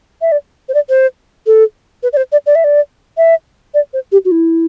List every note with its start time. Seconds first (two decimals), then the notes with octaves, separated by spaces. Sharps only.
0.22 E5
0.32 D5
0.69 C5
0.74 D5
0.89 C5
1.46 A4
2.03 B4
2.13 D5
2.17 C5
2.32 D5
2.46 D5
2.55 E5
2.64 D5
3.17 E5
3.74 D5
3.94 C5
4.12 G4
4.25 F#4
4.32 E4